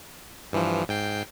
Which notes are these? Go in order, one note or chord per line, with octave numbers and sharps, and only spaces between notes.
G2 E3 F3
G#2 G5 C7